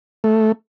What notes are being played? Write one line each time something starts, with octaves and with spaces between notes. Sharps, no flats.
A3